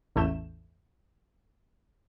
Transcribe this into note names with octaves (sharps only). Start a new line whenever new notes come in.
A1 E2 A3 G6 E7